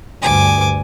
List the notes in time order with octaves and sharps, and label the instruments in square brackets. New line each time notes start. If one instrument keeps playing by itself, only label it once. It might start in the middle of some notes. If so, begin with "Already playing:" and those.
[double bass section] D2 G2 [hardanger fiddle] G#5 D6